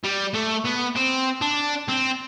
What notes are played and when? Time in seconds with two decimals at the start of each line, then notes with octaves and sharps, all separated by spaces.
0.04 G3
0.35 A3
0.65 B3
0.96 C4
1.42 D4
1.88 C4